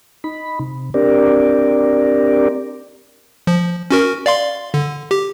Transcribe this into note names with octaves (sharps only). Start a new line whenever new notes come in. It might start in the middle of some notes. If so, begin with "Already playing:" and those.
D#4 B5
C3
C4 D4 G4 A#4 D5
F3
C#4 F#4 A#4
D5 F5 C6
D3
G4